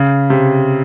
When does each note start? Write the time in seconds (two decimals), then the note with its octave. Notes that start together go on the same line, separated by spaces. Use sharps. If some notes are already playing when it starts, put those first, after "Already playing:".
Already playing: C#3
0.30 C3